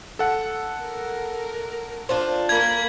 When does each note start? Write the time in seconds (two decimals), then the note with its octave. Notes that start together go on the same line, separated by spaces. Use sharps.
0.19 A4 F#5
0.79 A#4
2.09 D4 F4 C5
2.49 A#3 B5 G#6